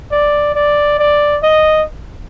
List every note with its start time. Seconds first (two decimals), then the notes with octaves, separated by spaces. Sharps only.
0.11 D5
0.55 D5
0.98 D5
1.43 D#5